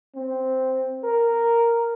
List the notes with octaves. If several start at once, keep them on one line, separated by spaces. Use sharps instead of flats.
C4
A#4